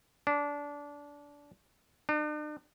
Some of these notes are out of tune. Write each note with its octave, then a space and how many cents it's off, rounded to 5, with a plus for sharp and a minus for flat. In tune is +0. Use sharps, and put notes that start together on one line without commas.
D4 -20
D4 +45